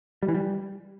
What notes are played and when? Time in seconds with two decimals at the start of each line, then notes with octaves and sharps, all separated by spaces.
0.23 G3
0.29 E3
0.35 G3